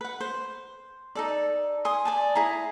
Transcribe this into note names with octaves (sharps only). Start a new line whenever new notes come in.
B4 F#5
C5
D#4 A4 D5
G#5 C6 D#6
D5 G#5 A5
E4 G#4 A#5